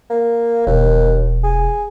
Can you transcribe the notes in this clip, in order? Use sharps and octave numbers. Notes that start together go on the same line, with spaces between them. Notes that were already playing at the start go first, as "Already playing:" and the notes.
A#3
E1 D#2
G#4